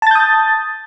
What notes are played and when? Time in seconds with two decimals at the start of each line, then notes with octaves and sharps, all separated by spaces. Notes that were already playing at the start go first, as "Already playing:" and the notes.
0.02 A5
0.07 A6
0.11 G6
0.15 D#6